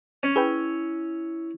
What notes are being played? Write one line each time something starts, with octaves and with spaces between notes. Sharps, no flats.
C#4
E4 G#4 B4 G5